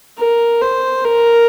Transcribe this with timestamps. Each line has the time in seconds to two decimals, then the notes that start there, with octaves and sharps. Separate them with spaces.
0.18 A#4
0.62 C5
1.05 A#4